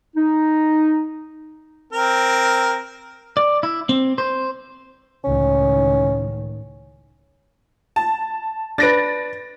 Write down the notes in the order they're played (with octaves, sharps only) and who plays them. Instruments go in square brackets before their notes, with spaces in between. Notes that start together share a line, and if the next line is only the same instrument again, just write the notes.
[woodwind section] D#4
[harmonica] C4 A#4
[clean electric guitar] D5
E4
C4
C5
[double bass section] C#2 A2 D#3 [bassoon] C#4
[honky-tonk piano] A5
[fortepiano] D4 B4 [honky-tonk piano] A6 A#6 D7